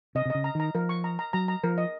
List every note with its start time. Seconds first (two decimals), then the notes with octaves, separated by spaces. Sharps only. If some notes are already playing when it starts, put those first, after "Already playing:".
0.15 C3 D#5
0.25 C3
0.30 C#3 D#5
0.44 A#5
0.55 D#3 A#5
0.75 F3 A#4
0.89 C#6
1.04 A#5
1.19 A#5
1.33 F#3 A#5
1.48 A#5
1.63 F3 A#4
1.78 D#5